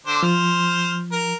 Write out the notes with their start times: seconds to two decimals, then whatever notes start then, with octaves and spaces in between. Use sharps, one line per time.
0.06 D3 D4 C5
0.23 F3 C5 F6
1.12 A#4